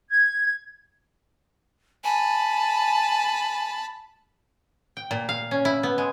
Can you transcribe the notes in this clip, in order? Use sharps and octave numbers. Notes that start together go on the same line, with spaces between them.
G#6
G#5 A5 B5
G5
A#2
F5
C#4
E4
B3
G#3